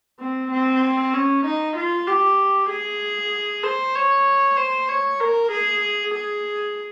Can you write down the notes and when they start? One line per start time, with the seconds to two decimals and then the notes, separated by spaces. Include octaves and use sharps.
0.20 C4
0.51 C4
1.14 C#4
1.46 D#4
1.76 F4
2.07 G4
2.69 G#4
3.64 C5
3.95 C#5
4.57 C5
4.88 C#5
5.20 A#4
5.52 G#4
6.14 G#4